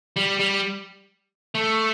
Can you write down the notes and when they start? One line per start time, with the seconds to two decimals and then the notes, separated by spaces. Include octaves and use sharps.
0.16 G3
0.39 G3
1.55 A3